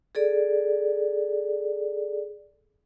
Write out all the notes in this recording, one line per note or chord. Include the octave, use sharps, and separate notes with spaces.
G#4 A4 D5